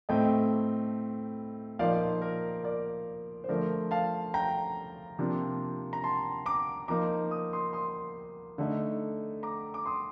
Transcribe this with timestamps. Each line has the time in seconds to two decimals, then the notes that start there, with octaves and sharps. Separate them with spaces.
0.09 A2 A3 C4 D#5 G5
1.79 A#2 F3 A#3 D#4 D5 F5
2.22 A#4
2.64 A#4 D5
3.44 C5
3.48 D3 F3 A3 A#4 D5
3.91 F5 A5
4.34 G5 A#5
5.19 C3 F3 A#3 D4 F4
5.93 A#5
6.04 A5 C6
6.46 A#5 D6
6.88 F3 A#3 D#4 A#5 D6
7.31 D#6
7.53 C6 D#6
7.73 C6 D#6
8.58 D3 A3 D#4
9.43 A#5 D6
9.74 D6
9.86 C6 D#6